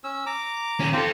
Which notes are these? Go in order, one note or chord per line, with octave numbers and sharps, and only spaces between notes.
C#4 E6
A#5 D6
D#3 C#4
C4 F4 G4 A4